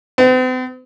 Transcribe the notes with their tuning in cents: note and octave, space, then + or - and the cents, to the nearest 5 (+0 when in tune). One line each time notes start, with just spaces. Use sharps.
C4 -45